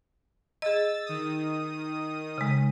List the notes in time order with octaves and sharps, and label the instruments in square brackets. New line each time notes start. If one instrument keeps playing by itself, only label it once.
[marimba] G#4 D#5 [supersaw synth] E6 A6
[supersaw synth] D#3 D#6
[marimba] C#3 G#3